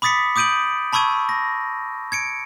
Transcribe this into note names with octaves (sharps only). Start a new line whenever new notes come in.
B5 D6 D#6 A6 B6 C#7
D6 D#6 G6 D7 D#7 F#7
A5 B5 C#6 E6 G#6 D#7
A#6
G#6 C#7 D7